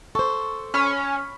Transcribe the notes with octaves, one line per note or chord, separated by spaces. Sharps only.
A4 C5 C#6
C#4 B5 C#6 F6